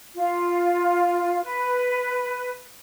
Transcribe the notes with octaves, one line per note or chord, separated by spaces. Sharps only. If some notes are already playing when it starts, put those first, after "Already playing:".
F4
B4